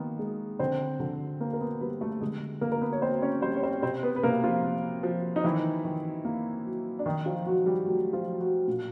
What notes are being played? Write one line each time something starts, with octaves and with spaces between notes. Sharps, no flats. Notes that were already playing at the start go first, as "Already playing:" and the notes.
Already playing: D#3 A#3 B3
G#3
D3 C4 C5
D3
A#3 A#4
A#4
B3 B4
G3 B3 B4
A3 A4
D3 G#3 G#4
D3 A#3 A#4
A#4
B3 B4
C#5
A#3 C4 C5
C#4 C#5
G3 C4 C5
C#5
C4 C5
C3 C4 C5
B3 B4
B4
C3 A#3 A#4
F3 F4
A#3
F3
D#4
D#3 E3 E4
D#3
A#3
F#3
D4
D#3 D#4
F3 F4
D#3 F#3 F#4
G3 G4
F#3 A3 F#4
F3 F4
F#3
F#3 F#4
A#2